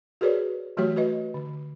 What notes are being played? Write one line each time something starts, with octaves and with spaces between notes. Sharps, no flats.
F#4 G#4 A#4 B4 C#5 D5
E3 F#3 A3 F#4 G4 C#5
F#4 B4 D#5
D3